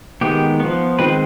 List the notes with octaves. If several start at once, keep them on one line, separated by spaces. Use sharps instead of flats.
D#3 G#3 B3 G4
F3 B3
D#3 G#3 C4 B4